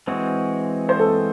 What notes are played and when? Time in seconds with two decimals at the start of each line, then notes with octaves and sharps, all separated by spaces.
0.07 E3 G#3 C4 F#4
0.89 C5
0.99 A4